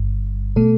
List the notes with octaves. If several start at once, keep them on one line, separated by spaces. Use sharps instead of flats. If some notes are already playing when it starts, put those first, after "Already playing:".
Already playing: G1 G2
B2 A3 A4